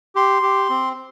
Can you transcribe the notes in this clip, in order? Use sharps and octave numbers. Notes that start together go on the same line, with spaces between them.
G4 C6
G4
C4